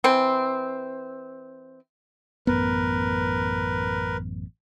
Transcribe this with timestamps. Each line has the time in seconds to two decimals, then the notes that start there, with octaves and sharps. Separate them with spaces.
0.04 E3 C4
2.47 A1 F#2 B3 A#4 B4